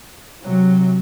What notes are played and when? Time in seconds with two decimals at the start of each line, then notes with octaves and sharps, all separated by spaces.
0.43 C3 F#3